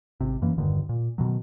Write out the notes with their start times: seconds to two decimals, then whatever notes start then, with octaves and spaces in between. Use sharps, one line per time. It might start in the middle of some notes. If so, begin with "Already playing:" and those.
0.21 G#1 C3
0.42 F#2 E3 A#3
0.58 E1 G2 D3 D#3
0.89 A#2
1.18 B2 D#3 F#3